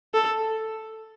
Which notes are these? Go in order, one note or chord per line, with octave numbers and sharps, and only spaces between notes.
A4